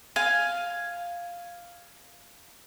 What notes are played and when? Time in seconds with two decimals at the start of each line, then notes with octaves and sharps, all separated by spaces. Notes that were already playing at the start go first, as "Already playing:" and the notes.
0.16 F5 G#5